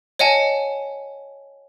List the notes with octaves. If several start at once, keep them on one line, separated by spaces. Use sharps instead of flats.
C#5 D#5 F#5 G#5 A5